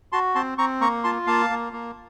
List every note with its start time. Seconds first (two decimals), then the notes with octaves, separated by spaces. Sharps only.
0.12 F#4 A5 C6
0.35 C4 A5 C6
0.58 C4 A#5 C#6
0.81 A#3 A#5 C#6
1.04 F4 A5 C6
1.27 A#3 F5 A5
1.50 A#3
1.73 A#3